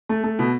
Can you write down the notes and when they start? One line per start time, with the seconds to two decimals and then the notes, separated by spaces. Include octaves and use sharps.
0.09 A3
0.24 A3
0.39 B2